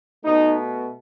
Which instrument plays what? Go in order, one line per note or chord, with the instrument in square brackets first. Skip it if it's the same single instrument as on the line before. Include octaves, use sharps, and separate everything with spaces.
[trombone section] B2 A3 D#4